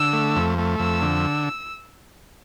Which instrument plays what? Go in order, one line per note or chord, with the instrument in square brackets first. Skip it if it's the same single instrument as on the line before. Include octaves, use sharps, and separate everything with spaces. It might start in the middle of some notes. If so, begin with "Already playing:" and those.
Already playing: [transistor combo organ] D3 [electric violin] E6
[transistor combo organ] A3
F2
A3
[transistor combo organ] F2 [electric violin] E6
[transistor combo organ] D3